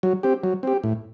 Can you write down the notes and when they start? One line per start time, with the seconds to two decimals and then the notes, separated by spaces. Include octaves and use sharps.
0.03 F#3
0.23 C4 G4
0.44 F#3
0.63 C4 G4
0.84 A2